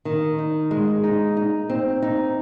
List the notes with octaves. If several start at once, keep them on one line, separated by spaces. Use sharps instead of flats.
D#3
D#4
G#3
D#4
D#4
C4
D#4